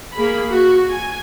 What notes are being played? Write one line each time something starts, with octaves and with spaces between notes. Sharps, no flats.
A#3 G#4 B5
F#4
G#5